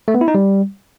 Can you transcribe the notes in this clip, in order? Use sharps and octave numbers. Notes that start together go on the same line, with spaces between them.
A3
B3
E4
D#4
G3